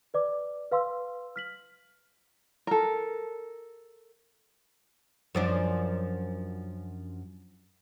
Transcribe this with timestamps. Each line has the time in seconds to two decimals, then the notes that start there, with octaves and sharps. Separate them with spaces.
0.14 B4 D5 D6
0.72 B4 F5 C6 E6
1.36 F6 B6 F#7
2.67 A4 A#4
5.35 F#2 F3 D4